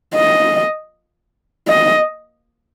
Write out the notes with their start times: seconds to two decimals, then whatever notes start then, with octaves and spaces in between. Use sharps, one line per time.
0.15 D#5
1.68 D#5